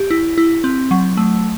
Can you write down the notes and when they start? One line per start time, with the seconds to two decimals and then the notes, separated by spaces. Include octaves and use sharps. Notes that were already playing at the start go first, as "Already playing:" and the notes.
Already playing: G4
0.10 E4
0.38 E4
0.64 C4
0.91 F#3
1.17 A3